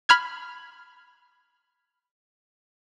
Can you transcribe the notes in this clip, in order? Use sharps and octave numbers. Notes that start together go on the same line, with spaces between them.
B5 F6 G#6